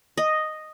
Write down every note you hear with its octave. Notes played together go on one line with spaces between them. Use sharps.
D#5